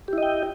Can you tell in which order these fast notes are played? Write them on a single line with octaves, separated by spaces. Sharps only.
G4 E4 D#5 G5